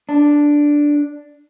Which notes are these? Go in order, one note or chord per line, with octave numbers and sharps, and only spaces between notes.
D4